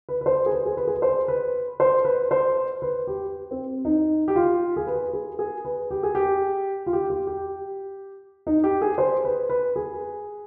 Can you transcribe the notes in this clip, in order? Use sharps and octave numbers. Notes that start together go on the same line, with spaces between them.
B4
B4
C5
G#4
B4
G#4
B4
G#4
B4
C5
B4
C5
B4
C5
B4
G4
C4
D#4
G4
F4
G#4
B4
G#4
G#4
B4
G4
G#4
G4
F4
G4
G4
G4
D#4
G4
G#4
C5
B4
B4
G#4